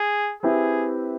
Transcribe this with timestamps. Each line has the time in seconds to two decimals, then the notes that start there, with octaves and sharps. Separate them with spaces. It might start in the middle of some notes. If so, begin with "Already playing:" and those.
Already playing: G#4
0.43 C4 E4 G4 G#4 B4 E5